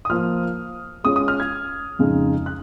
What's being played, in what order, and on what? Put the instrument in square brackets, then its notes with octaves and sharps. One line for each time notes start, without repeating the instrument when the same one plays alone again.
[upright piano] D#6
[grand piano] F3 A#3 F4 C5 [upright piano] F6
[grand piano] G#3 C#4 F4 G#4 C#5 [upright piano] D#6
[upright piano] D#6
F6
G#6
[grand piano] F2 C#3 G#3 D#4
[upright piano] F#6